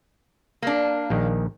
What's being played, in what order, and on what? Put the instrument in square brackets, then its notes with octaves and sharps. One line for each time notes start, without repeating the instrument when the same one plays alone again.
[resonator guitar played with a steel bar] A#3 D4
[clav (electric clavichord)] A#1 D#3